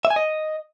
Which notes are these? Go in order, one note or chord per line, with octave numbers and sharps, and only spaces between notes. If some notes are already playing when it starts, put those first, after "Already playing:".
E5
G#5
D#5